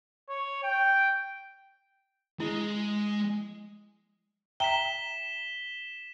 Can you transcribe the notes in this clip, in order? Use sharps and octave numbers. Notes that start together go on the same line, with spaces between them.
C#5
G5
G#3 E4
E5 G5 A#5 B6 E7 G7